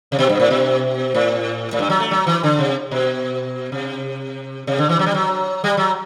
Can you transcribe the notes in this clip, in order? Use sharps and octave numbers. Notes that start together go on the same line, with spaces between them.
C3
B2
G2
A2
B2
A2
A2
G2
F#3
A3
F#3
E3
D3
C3
B2
C3
C3
D3
E3
F#3
G3
F#3
G3
F#3